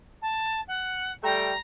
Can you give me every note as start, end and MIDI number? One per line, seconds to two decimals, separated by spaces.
0.22 0.61 81
0.68 1.12 78
1.23 1.52 55
1.23 1.52 57
1.23 1.52 79
1.23 1.59 82